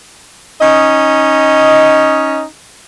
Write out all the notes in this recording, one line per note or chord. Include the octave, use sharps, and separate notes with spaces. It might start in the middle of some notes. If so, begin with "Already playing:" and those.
C#4 D#4 D#5